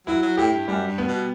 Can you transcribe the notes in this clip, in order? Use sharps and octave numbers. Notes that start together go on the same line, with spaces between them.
F#3 E4
F#3
A2 G4
G2
F#2 G3
G2
B3
B2